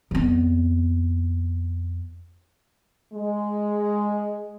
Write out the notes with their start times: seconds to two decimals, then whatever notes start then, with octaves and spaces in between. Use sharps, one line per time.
0.11 F2 B3
3.14 G#3